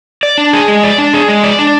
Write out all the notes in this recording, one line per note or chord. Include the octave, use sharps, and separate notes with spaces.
D5
D4
G#4
G#3
D5
D4
G#4
G#3
D5
D4